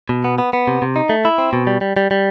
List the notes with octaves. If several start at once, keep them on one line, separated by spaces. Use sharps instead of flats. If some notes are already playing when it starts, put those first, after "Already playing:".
B2
B3
B3
B3
C3
C3
D#4
A3
E4
C4
B2
G3
G3
G3
G3